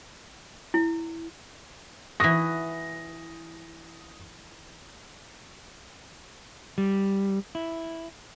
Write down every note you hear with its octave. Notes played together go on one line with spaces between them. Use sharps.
E4
E3 F#4 D#6 A#6
G3
E4